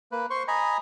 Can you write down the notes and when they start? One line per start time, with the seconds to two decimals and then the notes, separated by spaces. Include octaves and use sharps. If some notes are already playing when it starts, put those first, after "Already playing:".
0.12 A#3 B4
0.30 C5 C6 C#6
0.48 D#5 G#5 A#5 B5